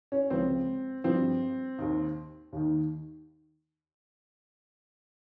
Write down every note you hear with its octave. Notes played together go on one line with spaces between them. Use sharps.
C#4
C#2 C#3 F3 C4
G2 F3 C4
D#2 D#3
D#2 D#3